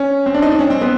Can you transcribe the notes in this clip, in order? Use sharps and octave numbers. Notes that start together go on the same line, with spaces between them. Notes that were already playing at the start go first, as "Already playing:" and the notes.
Already playing: C#4
C4
D4
D#4
D4
C#4
C4
B3